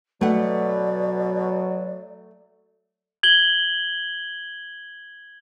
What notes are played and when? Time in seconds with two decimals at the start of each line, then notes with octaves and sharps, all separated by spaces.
0.21 B2 F#3 A3 D5 F#5
3.23 G#6 F#7 G7